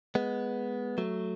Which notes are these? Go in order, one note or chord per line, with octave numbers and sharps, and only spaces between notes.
G#3 B3
F#3 A3